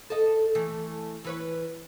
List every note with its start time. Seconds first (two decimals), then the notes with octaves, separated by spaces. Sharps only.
0.10 A4 D#5
0.55 E3 A3
1.25 E3 B4 C#5